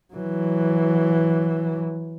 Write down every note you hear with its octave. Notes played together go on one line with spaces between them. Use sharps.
E3 F#3